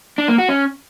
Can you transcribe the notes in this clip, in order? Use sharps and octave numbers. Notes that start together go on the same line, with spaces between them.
D4
A#3
F#4
C#4